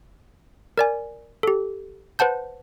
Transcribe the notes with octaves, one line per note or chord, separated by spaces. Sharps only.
A#4 D5 G#5
G4 A4
B4 C5 F#5 A5 G6